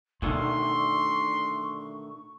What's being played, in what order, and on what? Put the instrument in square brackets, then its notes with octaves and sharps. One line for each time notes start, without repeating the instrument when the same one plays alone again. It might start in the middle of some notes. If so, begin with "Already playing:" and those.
[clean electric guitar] D2 D3 D#3 [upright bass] B2 D#4 [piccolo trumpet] C6 [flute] C#6